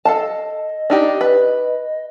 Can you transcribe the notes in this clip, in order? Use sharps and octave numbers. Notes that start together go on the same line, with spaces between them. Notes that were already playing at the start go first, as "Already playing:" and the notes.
A4 D#5 F5 A5
D4 D#4 G4
B4